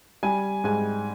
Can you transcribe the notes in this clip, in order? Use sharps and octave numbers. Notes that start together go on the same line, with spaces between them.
G3 G#5
G#2 G#5